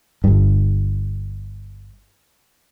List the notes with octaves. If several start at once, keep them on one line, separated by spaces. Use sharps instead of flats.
G1 G2